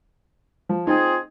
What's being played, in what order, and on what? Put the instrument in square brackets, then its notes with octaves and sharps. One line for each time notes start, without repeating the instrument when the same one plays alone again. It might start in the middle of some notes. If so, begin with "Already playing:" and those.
[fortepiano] F3
[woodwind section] C4 F4 G#4 [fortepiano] D#4